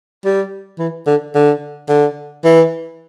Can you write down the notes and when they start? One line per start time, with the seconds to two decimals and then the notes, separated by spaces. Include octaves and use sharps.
0.25 G3
0.79 E3
1.07 D3
1.35 D3
1.89 D3
2.44 E3